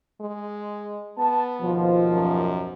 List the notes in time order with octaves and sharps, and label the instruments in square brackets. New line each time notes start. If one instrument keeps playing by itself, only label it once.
[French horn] G#3
[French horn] B3 [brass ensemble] A5
[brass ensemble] D#2 B2 F3
[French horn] F#2